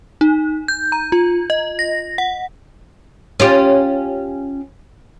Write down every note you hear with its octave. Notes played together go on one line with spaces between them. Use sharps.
D#4
G6
A#5
F4
D#5
A#6
F#5
C#4 F4 G4